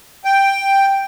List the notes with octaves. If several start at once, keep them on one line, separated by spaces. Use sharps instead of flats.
G5